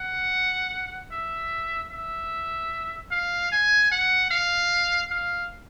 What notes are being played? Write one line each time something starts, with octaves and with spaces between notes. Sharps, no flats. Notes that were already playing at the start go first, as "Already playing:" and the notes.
Already playing: F#5
E5
E5
F5
G#5
F#5
F5
F5